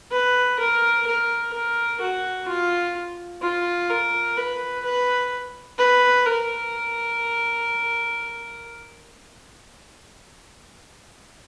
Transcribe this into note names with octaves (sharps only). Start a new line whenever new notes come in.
B4
A#4
A#4
A#4
F#4
F4
F4
A#4
B4
B4
B4
A#4